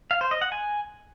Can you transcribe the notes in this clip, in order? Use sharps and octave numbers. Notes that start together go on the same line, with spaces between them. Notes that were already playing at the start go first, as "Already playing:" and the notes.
F5
C5
D#5
F#5
G#5